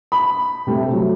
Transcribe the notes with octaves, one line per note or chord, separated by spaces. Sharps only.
B5
C3 A3
F#3